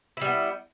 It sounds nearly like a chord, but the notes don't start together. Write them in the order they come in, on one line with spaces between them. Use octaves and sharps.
E4 G3 B3